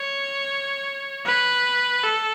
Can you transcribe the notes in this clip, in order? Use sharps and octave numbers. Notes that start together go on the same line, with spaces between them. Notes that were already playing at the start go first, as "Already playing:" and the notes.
Already playing: C#5
B4
A4